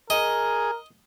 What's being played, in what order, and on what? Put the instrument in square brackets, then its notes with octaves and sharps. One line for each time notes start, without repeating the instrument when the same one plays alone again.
[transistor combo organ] G#4 [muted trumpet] A#4 [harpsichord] D#5